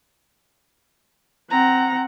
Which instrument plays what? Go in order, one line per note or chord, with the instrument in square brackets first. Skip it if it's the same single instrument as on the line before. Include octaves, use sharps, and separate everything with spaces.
[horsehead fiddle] C4 F#5 [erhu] A#5